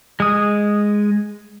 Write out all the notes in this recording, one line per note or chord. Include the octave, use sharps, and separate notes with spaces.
G#3 D#6